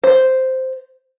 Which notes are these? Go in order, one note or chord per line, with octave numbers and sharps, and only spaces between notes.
C5